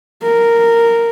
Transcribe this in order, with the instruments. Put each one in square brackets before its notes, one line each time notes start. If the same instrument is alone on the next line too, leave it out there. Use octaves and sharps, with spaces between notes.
[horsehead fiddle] A#4